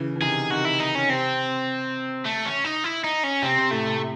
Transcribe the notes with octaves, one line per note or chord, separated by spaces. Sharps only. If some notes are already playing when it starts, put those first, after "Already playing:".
Already playing: C#3 E3
E3
C3 D#3 G#4
C3 D#3 F#4
E4
D#4
C#4
C3 C4
A3
C#4
D#4
E4
D#4
C#4
C3 C4
C3
A2 A3
C3